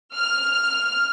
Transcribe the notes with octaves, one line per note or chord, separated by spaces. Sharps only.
F6